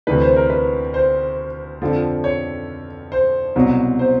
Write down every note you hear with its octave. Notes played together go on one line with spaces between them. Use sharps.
D2 C3 E3 B4
C5
A#4
B4
C5
F2 D3 F3
C#5
C5
C2 B2 F#3
C5